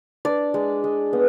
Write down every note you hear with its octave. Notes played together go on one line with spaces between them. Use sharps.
D4 D5
G#3
G#3
B3